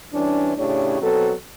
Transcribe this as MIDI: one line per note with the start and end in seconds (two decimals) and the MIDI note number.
0.13 0.52 52
0.13 0.52 55
0.13 0.52 61
0.13 0.52 62
0.58 1.00 45
0.58 1.00 49
0.58 1.00 62
0.58 1.00 67
0.58 1.00 73
1.02 1.34 47
1.02 1.34 54
1.02 1.34 60
1.02 1.34 69